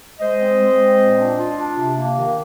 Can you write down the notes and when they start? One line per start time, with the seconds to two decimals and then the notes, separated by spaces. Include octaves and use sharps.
0.20 G#3 C5 D#5
0.40 C4
0.59 G#3
0.79 C4
0.99 A#2
1.18 D4
1.38 F4
1.58 D4
1.78 C3
1.97 A#3
2.17 D#3